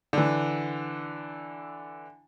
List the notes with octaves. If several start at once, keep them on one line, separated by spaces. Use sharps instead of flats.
D3 E3